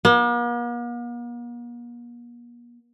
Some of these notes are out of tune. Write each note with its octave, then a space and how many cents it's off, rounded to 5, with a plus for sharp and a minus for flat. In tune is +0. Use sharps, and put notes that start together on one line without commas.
A#3 +45